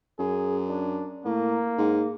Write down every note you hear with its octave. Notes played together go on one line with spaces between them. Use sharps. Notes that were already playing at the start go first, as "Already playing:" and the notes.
F#2 G#4
D4
A2 A#3
G#2